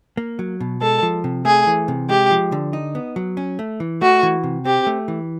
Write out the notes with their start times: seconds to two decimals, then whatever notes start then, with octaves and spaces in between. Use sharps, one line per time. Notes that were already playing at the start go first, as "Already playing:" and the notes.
0.17 A#3
0.39 F#3
0.60 B2
0.81 G#3 A4
1.03 F3
1.24 C3
1.45 A3 G#4
1.67 E3
1.88 C3
2.09 G#3 G4
2.31 F3
2.52 D3
2.73 D#4
2.95 B3
3.16 F#3
3.37 C#4
3.59 A3
3.80 E3
4.01 A3 F#4
4.23 E3
4.43 C3
4.65 C4 G4
4.87 A3
5.08 E3